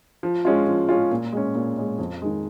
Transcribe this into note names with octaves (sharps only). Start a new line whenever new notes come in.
F3
G#3 C#4 F4
F3
G#3 C#4 F4
A#2
G#3 C#4
A#2
G#3 C#4
F2
D#3 G#3